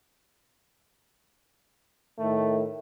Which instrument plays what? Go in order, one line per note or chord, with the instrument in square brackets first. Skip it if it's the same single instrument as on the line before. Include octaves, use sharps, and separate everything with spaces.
[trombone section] A2 D#3 A3